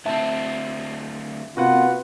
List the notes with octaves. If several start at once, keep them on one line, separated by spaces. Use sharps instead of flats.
D2 C4 E5 A5
C3 A#3 B3 F4 F#4 B4 F#5 F#6